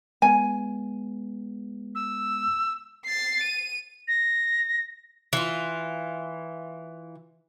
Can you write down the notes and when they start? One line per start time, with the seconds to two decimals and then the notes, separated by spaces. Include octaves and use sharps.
0.22 G#3 B3 G#5
1.95 E6
3.06 A6 C7
3.43 D#7
4.08 A#6
5.33 E3 F4